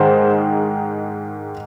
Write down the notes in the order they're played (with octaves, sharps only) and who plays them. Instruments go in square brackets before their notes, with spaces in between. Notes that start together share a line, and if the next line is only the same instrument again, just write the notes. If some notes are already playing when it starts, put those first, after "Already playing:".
Already playing: [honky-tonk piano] G#2 D#3 G#3 [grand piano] C5